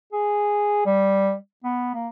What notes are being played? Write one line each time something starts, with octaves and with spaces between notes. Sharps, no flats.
G#4
G3
B3
A#3